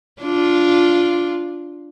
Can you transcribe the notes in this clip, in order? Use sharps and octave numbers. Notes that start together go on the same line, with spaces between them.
D4 F4